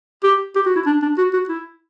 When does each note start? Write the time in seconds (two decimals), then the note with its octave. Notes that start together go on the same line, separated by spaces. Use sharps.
0.24 G4
0.55 G4
0.66 F#4
0.76 E4
0.86 D4
1.02 D4
1.18 F#4
1.33 F#4
1.49 E4